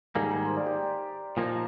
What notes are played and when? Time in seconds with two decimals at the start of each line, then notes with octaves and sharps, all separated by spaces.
0.15 G#2 D#3 G3 A#3 G#4
0.31 A#4
0.46 C5
0.56 D5
0.66 G4
1.37 A#2 F3 A#3 D#4